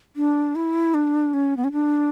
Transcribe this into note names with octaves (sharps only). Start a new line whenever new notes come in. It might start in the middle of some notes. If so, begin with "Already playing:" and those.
D4
E4
D4
C#4
B3
C#4
D4